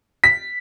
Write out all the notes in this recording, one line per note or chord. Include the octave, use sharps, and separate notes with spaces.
B6